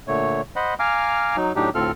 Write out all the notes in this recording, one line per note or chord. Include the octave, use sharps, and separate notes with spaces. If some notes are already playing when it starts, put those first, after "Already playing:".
A#2 D3 A3 C#5
C5 D#5 F#5 B5
F5 G#5 A#5 D6 F6
F#3 D#4
A2 F#3 D4 D#4 G4
D2 A2 C4 F4 A4 F6